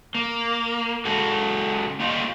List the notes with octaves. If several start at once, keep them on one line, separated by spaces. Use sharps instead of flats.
A#3
C#3 F#3 G#3 F#4 A4
A#3 F4 G4 C#5 D#5 F5